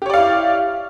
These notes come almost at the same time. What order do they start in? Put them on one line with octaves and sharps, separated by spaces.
G4 C#5 D5 F5 E4